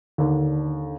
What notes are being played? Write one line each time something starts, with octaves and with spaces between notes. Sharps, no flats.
D#2 D3